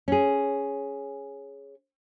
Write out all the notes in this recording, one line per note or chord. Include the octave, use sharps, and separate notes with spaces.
C#4 G#4